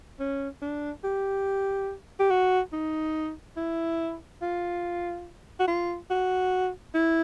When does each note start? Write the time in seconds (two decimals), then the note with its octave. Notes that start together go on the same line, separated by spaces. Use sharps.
0.19 C#4
0.62 D4
1.04 G4
2.20 G4
2.30 F#4
2.73 D#4
3.57 E4
4.41 F4
5.60 F#4
5.68 F4
6.10 F#4
6.95 E4